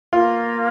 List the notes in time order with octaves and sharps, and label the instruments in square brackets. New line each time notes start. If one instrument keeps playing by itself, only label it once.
[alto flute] A#3 [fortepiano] F4